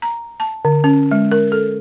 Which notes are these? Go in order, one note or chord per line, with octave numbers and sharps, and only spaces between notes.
A#5
A5
D3
C#4
G#3
A#4
A4